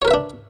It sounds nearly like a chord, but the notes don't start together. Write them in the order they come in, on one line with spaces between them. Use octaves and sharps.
C#5 A#4 B4 E5 D4